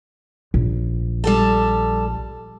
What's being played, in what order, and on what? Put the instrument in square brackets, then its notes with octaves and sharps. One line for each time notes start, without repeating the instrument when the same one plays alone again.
[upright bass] A#1
[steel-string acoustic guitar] G3 A4 A5